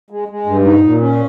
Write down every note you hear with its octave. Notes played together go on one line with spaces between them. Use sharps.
G#3
G#3
G2
D#4
A#2
C#4